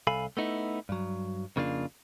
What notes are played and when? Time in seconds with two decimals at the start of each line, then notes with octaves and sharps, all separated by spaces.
0.07 C2 A4 F5 G#5 B5
0.37 A3 B3 D#4 E4
0.89 G2 F#3
1.56 F2 C#3 A#3 D4 F4